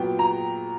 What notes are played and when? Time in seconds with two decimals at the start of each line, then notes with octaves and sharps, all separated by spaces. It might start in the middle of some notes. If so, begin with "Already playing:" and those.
Already playing: A#2 F#3 B3 G5
0.19 A#5